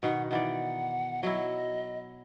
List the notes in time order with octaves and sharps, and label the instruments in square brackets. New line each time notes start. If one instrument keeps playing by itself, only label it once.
[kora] B2 D#3 [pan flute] F#5
[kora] D#3 E3 D5 [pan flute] F#5
[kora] F#3 E4 [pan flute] D#5